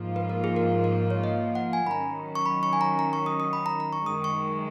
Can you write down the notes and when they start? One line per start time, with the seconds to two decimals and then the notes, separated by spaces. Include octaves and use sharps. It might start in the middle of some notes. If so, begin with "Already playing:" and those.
Already playing: G#2 F3 A#3 F4
0.16 B4
0.30 A#4
0.44 G#4
0.56 A#4
0.84 A#4
1.10 C#5
1.24 D#5
1.55 F#5
1.73 G#5
1.87 B5
1.91 D#3 F#3 C#4 A#5
2.35 C#6
2.46 B5
2.63 C#6
2.73 G#5
2.81 A#5
2.99 A#5
3.13 C#6
3.26 D#6
3.40 D#6
3.53 B5
3.66 A#5
3.80 A#5
3.93 C#6
4.06 F#2 D#3 G#3 D#6
4.24 C#6